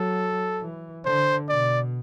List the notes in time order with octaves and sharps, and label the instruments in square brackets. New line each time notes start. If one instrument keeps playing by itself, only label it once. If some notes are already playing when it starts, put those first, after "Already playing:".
Already playing: [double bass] F#3 [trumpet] A4
[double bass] E3
[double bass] D3 [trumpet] C5
[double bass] B2 [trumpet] D5